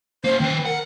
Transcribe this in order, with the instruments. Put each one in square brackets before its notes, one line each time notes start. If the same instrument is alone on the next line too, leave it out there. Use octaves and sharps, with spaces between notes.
[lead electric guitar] A#3 C#4 [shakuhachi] C5
[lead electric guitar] D#3 B4 [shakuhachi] G5
[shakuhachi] A#4 [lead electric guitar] F#5